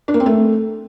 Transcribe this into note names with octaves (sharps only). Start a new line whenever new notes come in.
D4
A#3
C4
A3